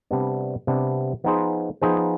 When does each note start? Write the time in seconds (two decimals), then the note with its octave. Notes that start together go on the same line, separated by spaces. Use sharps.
0.11 C3 G3 B3 D4
0.67 C3 G3 B3 D4
1.24 F3 B3 D#4 G#4 C5
1.82 F3 B3 D#4 G#4 C5